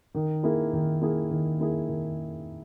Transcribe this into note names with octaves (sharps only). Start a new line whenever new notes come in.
D#3
A#3 E4 G#4
D#3
A#3 E4 G#4
D#3
A#3 E4 G#4
D#3